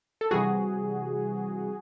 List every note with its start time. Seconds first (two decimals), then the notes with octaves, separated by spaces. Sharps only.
0.21 A4
0.31 C3 E3 G3 F#4 G#4